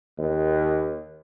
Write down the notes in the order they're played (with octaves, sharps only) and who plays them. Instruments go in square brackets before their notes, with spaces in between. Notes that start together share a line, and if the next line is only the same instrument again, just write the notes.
[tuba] D#2